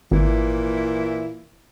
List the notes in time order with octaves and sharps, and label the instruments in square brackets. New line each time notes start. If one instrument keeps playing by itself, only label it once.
[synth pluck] G#1 [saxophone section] A#2 E3 E4